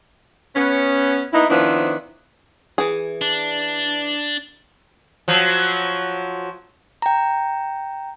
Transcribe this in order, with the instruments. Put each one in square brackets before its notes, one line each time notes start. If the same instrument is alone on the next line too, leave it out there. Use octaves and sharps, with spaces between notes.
[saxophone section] B3 C#4
A#3 B3 D#4 E4
D#3 F3 B3 C4 D4 E4
[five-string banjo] E3 G#4
[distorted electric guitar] D4
[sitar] F3 F#3
[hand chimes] G5 A#5